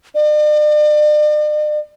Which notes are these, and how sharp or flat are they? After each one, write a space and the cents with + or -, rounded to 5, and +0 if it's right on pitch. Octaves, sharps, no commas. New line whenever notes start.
D5 +45